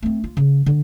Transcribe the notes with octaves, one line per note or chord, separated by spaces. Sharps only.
A3 C4
F4
C#3
D3